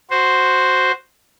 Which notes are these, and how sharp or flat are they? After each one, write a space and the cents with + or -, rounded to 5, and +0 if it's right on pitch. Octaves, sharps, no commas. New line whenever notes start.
F#4 +0 C5 +0